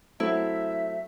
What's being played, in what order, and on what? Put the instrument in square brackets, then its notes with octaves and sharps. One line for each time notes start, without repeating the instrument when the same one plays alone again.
[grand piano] F#3 A3 C4 [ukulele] E4 [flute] E5